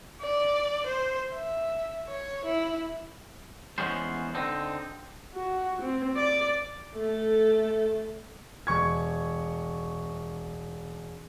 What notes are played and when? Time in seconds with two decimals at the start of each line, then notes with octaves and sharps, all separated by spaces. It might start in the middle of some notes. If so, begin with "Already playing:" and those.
0.21 D5
0.86 C5
1.34 E5
2.08 C#5
2.45 E4
3.78 E2 G#3 B3 C#4 C5
4.34 D3 C4 D#4
5.35 F#4
5.82 C4
6.17 D5
6.94 A3 A4
8.67 E1 C#6 G#6